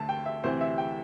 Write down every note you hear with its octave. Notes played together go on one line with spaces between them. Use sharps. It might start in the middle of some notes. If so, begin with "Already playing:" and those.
Already playing: D2 D3 A3 A5
G5
E5
D2 C3 E3 C4 C5
E5
G5